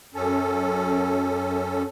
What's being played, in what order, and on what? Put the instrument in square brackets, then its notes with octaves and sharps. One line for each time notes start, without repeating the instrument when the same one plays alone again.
[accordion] F#2 C#4 A4